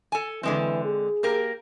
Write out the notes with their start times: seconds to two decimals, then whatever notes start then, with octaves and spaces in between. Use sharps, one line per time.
0.12 A4 G#5
0.43 D3 E3 G#3 C4
0.84 G#4
1.23 A#3 G4 A#4